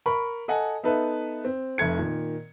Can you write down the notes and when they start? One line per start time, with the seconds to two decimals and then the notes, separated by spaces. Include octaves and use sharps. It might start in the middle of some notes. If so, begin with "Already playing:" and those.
0.06 A#4 B5 C#6
0.48 A4 D#5 F#5 G#5
0.83 B3 D#4 A4 B4 E5
1.45 C4
1.78 F1 A3 G#6 C#7
1.99 A#2 D#3